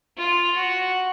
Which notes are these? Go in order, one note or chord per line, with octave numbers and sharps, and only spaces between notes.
F4
F#4